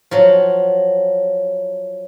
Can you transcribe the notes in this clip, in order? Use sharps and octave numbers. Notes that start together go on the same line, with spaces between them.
F3 F#3